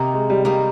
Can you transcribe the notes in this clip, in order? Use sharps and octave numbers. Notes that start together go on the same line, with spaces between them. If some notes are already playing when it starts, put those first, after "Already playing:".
Already playing: C3 D#3 A#3 D#4
G#3
G3
D#3 G3 A#3 D#4